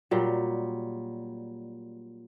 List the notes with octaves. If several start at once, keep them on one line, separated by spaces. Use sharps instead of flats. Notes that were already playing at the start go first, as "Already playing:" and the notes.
A#2 F#3 G3